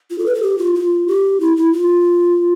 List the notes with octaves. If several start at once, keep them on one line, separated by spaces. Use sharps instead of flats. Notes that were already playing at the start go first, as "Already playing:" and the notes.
F4
A4
B4
A4
G4
F4
F4
G4
E4
E4
F4